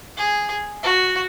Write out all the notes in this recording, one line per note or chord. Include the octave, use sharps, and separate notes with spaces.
G#4
F#4